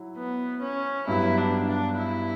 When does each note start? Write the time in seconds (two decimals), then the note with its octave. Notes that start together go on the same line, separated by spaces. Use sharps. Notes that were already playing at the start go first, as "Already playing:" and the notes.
Already playing: F#3 E4
0.17 B3
0.62 C#4
1.07 G2 F#3 B3 E4
1.38 D4
1.67 D4
1.98 E4